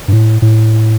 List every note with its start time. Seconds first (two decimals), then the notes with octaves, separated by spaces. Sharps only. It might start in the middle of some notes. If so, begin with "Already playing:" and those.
0.08 G2
0.12 A2
0.42 A2